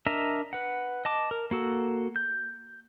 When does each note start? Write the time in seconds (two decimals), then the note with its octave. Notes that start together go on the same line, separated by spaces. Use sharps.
0.06 D4 A#4 D#5 E5 A#5
0.53 B4 F#5
1.05 D#5 A5 D6
1.31 A#4
1.51 A#3 F#4 A4
2.16 G6